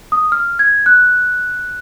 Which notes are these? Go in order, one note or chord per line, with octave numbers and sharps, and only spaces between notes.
D#6
F6
G#6
F#6